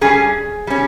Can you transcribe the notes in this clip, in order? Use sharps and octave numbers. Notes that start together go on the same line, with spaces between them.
G2 G3 C#4 G#4 G#5
G3 C#4